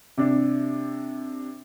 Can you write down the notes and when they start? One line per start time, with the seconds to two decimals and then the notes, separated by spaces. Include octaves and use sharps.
0.18 C3 D4